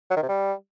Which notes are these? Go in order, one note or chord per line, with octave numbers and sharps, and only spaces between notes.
F#3
D#3
C3
G3